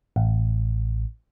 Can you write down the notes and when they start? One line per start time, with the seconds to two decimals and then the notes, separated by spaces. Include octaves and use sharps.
0.16 A1